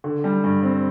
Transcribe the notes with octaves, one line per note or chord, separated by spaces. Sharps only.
D3
G3
G2
C4